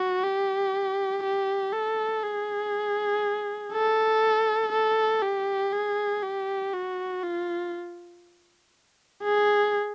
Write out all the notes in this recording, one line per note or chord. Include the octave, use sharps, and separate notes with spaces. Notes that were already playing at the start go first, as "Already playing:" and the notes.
Already playing: F#4
G4
G4
A4
G#4
A4
A4
G4
G#4
G4
F#4
F4
G#4